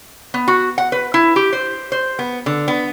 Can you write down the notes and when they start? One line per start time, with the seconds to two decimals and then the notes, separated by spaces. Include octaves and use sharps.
0.34 B3
0.48 F#4
0.78 F#5
0.92 B4
1.14 E4
1.36 G4
1.53 C5
1.92 C5
2.19 B3
2.46 D3
2.68 B3